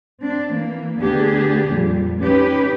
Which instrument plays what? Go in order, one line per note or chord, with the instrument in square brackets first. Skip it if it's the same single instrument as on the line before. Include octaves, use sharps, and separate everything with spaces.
[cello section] C4 D4
E3 A#3
D2 B3 D4 G4 G#4
F2 A#2 G3
C#4 D#4 G4 B4